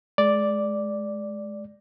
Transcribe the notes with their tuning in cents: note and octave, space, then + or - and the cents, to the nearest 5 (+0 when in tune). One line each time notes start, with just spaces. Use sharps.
G#3 +25 D5 +0